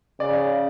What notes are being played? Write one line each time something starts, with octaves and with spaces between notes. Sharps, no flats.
C#3 D5